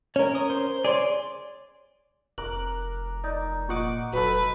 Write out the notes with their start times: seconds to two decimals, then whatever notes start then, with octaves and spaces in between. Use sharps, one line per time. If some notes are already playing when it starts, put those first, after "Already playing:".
0.16 C#4 A#4 C#5
0.35 D#6
0.50 C5
0.85 G#4 C#5 D5 C6
2.38 F1 A#4 D6 F#6
3.24 D#4 D5
3.69 A#2 D#5 F#5 C#6 D6
4.13 F1 F#3 F#4 A4 B4 B5